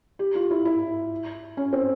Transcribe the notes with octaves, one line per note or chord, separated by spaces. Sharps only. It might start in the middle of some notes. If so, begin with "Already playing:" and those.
G4
F4
E4
E4
C#4
C4